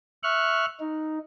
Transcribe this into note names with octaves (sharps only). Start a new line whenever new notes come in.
E5 C#6 F6 F#6
D#4